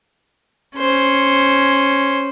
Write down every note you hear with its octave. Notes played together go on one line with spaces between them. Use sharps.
C#4 C5